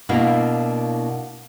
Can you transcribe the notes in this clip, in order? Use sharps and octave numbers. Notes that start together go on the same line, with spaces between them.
B2 A#3 D4 E4 A#4 F5